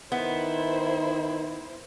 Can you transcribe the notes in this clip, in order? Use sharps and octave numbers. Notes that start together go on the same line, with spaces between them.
D#3 B3 E4 C5